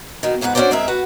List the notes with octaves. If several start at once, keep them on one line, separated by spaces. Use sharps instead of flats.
B2 D#3
F2 G#2 B3 G4 F#5
C#4 D4 E4 F#4 C5 D5
G#3 C4 G#4 A#4 E5
F#4 B4 F#5